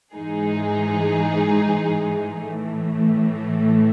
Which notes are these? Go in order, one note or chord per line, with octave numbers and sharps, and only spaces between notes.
G#2 E3 G#3 D#4 G#4
A2 E3 A3